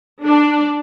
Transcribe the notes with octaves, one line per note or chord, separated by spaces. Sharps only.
D4